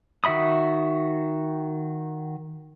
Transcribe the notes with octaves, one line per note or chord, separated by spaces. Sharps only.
D#3 F#4 E5 B5 D#6